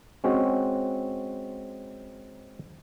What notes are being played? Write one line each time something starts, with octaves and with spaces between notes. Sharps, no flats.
G#3 C4 C#4 F#4